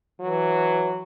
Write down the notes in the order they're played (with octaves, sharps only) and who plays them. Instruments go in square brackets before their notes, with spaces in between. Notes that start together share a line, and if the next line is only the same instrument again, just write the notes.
[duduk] E3 [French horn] F#3